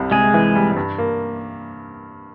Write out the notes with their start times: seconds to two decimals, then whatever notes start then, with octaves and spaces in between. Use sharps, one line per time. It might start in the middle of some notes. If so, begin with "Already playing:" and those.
Already playing: C2 C3 G3
0.11 C3 G#3 G#4
0.34 E3
0.55 G3
0.76 G2
0.98 A#3